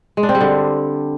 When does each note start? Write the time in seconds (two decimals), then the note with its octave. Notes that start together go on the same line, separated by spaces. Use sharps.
0.17 G#3
0.23 D4
0.29 C4
0.35 G3
0.41 D3